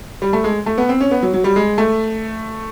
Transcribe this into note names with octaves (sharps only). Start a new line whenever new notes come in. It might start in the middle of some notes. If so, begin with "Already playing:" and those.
G3
A3
G#3
A3
B3
C4
C#4
B3
F#3
F#3
G3
G#3
A3